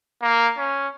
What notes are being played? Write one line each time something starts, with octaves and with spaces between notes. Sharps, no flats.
A#3
C#4